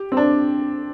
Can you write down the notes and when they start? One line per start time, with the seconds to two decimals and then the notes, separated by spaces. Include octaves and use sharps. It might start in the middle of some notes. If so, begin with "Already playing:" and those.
Already playing: G4
0.12 C4
0.17 D4